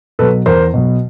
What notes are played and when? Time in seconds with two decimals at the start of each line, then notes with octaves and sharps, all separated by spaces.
0.19 B2 A4 B4
0.22 F#3
0.46 E2 A#4 C5
0.74 B2 F#3